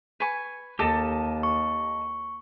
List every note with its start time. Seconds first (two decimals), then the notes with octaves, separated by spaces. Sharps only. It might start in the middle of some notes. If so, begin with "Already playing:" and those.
0.20 B4 G#5 C#6
0.79 D#2 G4 A4 D#5 A5
1.43 C#6